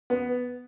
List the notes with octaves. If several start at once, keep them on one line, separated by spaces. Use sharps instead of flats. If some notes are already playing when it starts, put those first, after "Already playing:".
B3